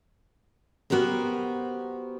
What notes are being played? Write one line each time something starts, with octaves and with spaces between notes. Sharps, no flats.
B3 F#4 G4 A#4 C5